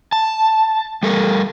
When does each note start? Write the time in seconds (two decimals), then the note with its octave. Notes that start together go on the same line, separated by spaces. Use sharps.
0.12 A5
1.03 G3 A4 A#4